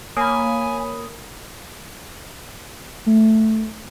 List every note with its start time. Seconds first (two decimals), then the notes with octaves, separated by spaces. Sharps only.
0.17 A#3 C#5 G#5 B5 D#6
3.06 A3